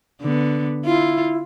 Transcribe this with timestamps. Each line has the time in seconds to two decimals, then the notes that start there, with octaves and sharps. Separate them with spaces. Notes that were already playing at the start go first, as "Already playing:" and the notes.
0.22 D3 B3
0.85 E4 F4